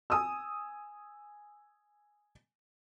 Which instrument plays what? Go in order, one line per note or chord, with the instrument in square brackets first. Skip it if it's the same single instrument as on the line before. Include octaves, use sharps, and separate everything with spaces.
[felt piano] G#5 D#6 E6